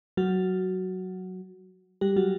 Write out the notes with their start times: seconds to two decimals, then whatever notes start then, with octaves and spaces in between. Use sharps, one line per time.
0.17 F#3 F#4
2.01 G3 G4
2.16 F#3 F#4